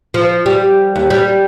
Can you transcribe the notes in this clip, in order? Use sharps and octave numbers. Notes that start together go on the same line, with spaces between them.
F3
G3
D#2
G3